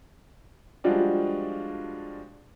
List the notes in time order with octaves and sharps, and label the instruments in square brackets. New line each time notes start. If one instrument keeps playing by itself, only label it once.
[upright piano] F3 G3 G#3 D4 F4 F#4